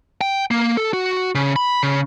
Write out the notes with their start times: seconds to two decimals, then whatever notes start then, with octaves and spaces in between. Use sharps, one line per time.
0.21 G5
0.51 A#3
0.77 A4
0.93 F#4
1.35 C#3
1.56 B5
1.83 C#3